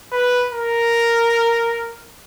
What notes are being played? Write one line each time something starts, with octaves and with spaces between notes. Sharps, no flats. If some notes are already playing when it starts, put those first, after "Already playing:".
B4
A#4